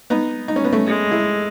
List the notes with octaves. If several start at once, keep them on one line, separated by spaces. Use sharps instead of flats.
B3 D#4
D#4
C#4
B3
A3 C#4
G#3
E4 G#4